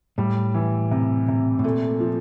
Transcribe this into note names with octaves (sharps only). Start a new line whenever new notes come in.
A2 G3
E3
C3
C3
A2
A#2 A3
F3